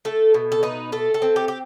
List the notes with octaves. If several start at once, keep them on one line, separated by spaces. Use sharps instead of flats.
A3 A4
B2
A4
D#4 B4
A3 A4
A4
C4
G4
G4